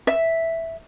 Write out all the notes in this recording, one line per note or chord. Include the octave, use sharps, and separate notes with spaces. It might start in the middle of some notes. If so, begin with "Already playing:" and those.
E5